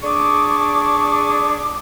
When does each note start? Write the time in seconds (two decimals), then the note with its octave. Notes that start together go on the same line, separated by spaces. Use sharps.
0.03 D4 G#4 C#6 D6